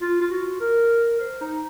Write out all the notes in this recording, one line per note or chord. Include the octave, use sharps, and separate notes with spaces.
F4
F4
F#4
A#4
C5
D#4